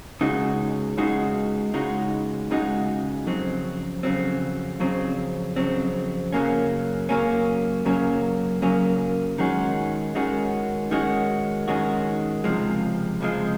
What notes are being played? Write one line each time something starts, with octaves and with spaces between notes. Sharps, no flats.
C#2 C#3 G#3 D#4 F#4
C#2 C#3 G#3 D#4 F#4
C#2 C#3 G#3 D#4 F#4
C#2 C#3 G#3 D#4 F#4
F2 C#3 F#3 C4
F2 C#3 F#3 C4
F2 C#3 F#3 C4
F2 C#3 F#3 C4
F#2 C#3 F#3 A#3 C#4
F#2 C#3 F#3 A#3 C#4
F#2 C#3 F#3 A#3 C#4
F#2 C#3 F#3 A#3 C#4
D#3 G#3 C#4 F#4
D#3 G#3 C#4 F#4
D#3 G#3 C#4 F#4
D#3 G#3 C#4 F#4
C#2 C3 F3 G#3
C#2 C3 F3 G#3